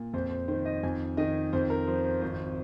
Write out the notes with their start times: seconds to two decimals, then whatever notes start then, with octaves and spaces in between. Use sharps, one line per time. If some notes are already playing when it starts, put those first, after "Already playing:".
Already playing: A#2
0.13 F2 C5
0.31 C5
0.48 D#3 C5
0.65 D#5
0.83 F2 G#5
1.17 D#3 D#5
1.53 F2 C5
1.70 A#4
1.87 F3 C5
2.05 C5
2.22 G#1 C5